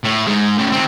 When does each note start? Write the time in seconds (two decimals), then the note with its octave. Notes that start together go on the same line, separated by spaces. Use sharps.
0.04 A2
0.27 G#2 G#3
0.58 A2 C#3
0.72 D#3 C4